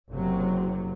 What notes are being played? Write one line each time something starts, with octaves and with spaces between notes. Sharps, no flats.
F#1 C3 F#3